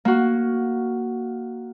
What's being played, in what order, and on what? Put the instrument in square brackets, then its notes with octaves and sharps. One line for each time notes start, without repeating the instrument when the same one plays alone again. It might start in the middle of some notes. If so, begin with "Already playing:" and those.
[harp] A#3 F#4